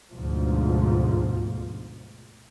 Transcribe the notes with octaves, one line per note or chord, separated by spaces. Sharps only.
D2 G#2 B2 F3